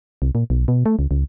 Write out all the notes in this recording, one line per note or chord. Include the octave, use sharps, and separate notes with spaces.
C2
A#2
B1
B2
A3
C#2
C#2